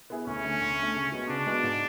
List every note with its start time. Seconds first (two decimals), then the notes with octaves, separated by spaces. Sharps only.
0.10 B3 E4 G#4 B4
0.27 D2 C#4
0.44 D3 A3
0.61 D2
0.79 D3 A3
0.95 C#3
1.11 G#3 B3 F#4
1.29 C#3 D4
1.46 G#3 B3 F#4
1.63 G#2